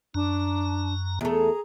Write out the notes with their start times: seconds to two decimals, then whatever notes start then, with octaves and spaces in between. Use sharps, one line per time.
0.14 F#2 D4 A5 A#5
1.21 E2 A3 G#4 A#5